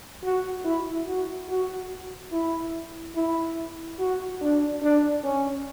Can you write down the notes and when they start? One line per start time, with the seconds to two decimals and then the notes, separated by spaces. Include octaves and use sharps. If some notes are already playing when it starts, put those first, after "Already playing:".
0.23 F#4
0.65 E4
1.07 F#4
1.49 F#4
2.32 E4
3.15 E4
3.99 F#4
4.41 D4
4.82 D4
5.24 C#4